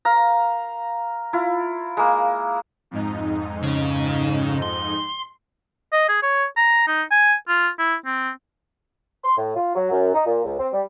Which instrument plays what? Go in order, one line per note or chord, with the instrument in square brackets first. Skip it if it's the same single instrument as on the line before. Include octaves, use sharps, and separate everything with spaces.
[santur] A#4 F5 A#5
E4 F4
G#3 A#3
[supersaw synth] F2 G#2 D#4
[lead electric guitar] C#3
C6
[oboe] D#5
G#4
C#5
A#5
D#4
G#5
F4
E4
C4
[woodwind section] C6
A2
F4
F#3
F#2
D#4
A#2
C#2
C4
G3